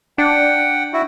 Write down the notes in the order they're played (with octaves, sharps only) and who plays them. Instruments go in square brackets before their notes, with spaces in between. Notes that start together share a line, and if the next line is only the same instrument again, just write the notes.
[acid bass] D4 [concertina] F#5 G5
[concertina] E4 F#4